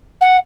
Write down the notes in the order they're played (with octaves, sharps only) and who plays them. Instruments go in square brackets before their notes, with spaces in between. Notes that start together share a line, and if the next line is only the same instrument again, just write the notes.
[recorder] F#5